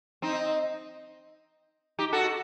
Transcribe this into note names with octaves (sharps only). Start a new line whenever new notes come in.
C4 D#4
D#4 G4
F#4 A4